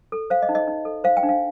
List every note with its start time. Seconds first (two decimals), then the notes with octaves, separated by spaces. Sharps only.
0.12 A4
0.30 C5 F5
0.42 D#5
0.49 D#4
0.55 D#5
0.68 D#4
0.85 A4
1.04 C5 F5
1.17 G5
1.23 D4
1.29 F5